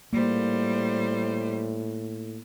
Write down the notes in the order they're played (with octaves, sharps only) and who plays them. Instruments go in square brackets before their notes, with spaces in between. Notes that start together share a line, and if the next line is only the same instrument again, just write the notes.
[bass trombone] A2 [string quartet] G3 C5 [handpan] A#3